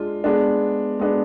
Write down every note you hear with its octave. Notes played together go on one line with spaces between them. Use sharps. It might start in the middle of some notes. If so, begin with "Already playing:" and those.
Already playing: G#3 D4 F4
G#3 B3 D4
G#3 B3 D4